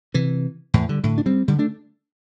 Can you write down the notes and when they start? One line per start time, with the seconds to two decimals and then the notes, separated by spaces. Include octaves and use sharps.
0.14 C3 E3
0.74 E2 A2
0.89 D3 G3
1.04 A2 D3
1.18 D4
1.26 G3 C4
1.48 D3 G3
1.59 A3 D4